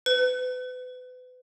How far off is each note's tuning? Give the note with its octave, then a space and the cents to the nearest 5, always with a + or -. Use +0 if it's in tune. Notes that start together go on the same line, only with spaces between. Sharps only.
B4 +35